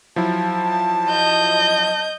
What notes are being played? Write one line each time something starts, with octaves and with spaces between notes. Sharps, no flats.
F3 F#3 E4 A5
D#5 G6